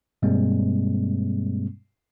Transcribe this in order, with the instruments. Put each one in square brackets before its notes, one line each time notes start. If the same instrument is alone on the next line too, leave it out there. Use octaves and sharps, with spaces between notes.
[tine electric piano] G2 B2 G3 G#3 A#3 C4